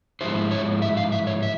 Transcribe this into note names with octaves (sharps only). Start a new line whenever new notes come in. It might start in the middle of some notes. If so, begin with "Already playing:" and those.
G#2 F3 G#3 E4 C5
C#5
E5
F5
E5
C#5
E5